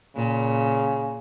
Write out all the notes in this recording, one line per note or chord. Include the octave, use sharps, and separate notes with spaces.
A#2 C#3